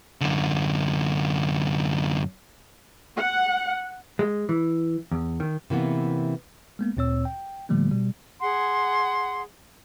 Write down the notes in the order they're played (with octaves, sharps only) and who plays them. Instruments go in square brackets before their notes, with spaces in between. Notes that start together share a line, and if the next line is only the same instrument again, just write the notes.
[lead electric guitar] F#2 D3
[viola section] F#5
[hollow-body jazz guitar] G#3
E3
E2
D#3
[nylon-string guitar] C3 E3 A#3 B3
[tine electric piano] G#3 A#3 B3
D2 A#2 C4 C#5 E6
G5
A2 D3 F3 G3 A3 A#3
B2 G3
[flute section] G#4 F#5 C6